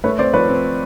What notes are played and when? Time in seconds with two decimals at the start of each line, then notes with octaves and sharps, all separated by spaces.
0.04 A3 B4 C#5
0.19 C4 C5 D5
0.33 F3 B4 C#5
0.49 C4